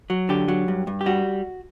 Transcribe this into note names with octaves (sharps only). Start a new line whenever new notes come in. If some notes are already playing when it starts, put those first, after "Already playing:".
F#3
D3 G4
F#3
G2
G2
G4
G3 F#4